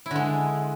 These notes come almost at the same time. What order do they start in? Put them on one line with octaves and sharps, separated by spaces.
E4 D3 G#3